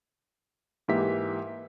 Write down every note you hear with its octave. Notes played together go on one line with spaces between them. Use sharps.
G#2 E3 A#3 G4 E5 B6